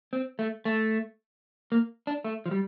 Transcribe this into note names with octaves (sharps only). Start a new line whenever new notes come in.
C4
A3
A3
A#3
D4
A3
F3
G3